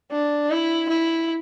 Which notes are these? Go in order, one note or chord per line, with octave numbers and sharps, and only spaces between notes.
D4
E4
E4